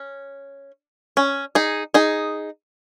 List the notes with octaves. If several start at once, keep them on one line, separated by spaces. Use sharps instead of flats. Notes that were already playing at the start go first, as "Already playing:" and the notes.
Already playing: C#4
C#4
D#4 G#4
D#4 G#4